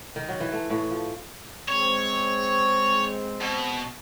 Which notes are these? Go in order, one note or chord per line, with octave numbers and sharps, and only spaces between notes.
D#3
F#3
E3
A3
A2
F3
G#3 C4 C#5
B2